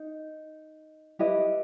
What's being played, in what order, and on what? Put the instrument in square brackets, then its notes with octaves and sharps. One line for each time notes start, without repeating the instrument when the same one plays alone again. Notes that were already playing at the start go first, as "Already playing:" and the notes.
Already playing: [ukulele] D#4
E4 G4 B4 D#5